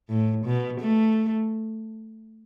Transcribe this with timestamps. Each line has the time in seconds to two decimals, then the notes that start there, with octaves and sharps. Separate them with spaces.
0.09 A2
0.46 B2
0.81 A3